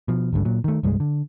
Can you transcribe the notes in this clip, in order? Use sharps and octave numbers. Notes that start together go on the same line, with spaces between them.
B2 F3
G#1 D2 G2 D3
A#2 F#3
D#3 A3
C2 G2 E3 G#3
D3